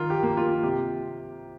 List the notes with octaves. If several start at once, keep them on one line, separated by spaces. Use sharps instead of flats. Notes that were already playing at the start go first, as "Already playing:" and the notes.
Already playing: D#3 F4
G4
A#3
F4
C3 G4